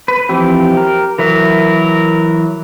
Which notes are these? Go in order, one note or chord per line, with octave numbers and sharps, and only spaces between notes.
B4
E3 F3 C4 G4
A#4
E3 F#3 A#4 E5